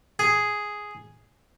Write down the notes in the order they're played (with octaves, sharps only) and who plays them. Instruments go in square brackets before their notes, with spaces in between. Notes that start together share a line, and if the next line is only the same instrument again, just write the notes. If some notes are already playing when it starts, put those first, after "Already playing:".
[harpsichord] G#4